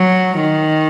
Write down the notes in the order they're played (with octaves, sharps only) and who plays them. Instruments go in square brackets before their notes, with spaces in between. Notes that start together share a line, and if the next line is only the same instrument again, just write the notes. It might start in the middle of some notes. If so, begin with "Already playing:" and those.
Already playing: [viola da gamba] F#3
D#3